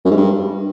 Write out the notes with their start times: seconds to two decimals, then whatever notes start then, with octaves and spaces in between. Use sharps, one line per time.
0.05 F#2
0.11 G#2
0.17 G2